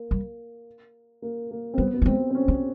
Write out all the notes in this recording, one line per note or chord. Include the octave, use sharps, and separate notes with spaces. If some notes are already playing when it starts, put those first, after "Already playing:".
Already playing: A#3
G3
A#3
A#3
C4
G3 B3
B3
G3
G#3 C4
C4
C#4
B3